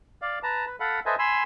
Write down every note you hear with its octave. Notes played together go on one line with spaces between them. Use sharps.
D5 F5
B4 A5 A#5
B4
A4 F5 F#5 B5
A4 B4 C5 D#5 E5 G#5
G#5 B5 C6 E6